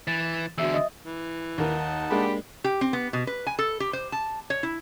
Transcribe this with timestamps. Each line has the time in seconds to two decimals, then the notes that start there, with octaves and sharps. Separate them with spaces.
0.07 E3 A6 E7
0.58 E2 D3 F#4 E5 E6
0.74 D#5 E5 D#6
1.05 E3
1.58 D#2 D#4 A#4 F#5 A5
2.11 G#3 A#3 D4 G4 B5
2.64 G4
2.81 C4
2.93 B3
3.13 B2
3.27 B4
3.47 G#5
3.59 A4
3.80 G4
3.93 C5
4.12 A5
4.50 C#5
4.63 E4